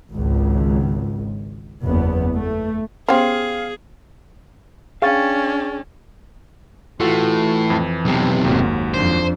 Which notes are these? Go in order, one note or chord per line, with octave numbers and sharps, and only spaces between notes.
G#1 C#2
F#1 E2 B3
A3
B3 C#4 G4 G#4 C5 F5 C6
C#4 D4 G#4 F5 G5 C#6 A6
A2 E3 F4 F#4 A4
F2
B1 C3
F#1 D#2 G#2 F#3
F2 D4 C5